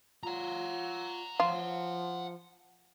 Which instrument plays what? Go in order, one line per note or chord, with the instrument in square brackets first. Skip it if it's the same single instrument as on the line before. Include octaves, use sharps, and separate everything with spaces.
[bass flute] F4 [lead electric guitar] F#5 A#5
[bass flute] F3 [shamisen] F4